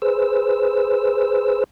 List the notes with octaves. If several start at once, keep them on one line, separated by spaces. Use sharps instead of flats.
G#4 B4 C5 E6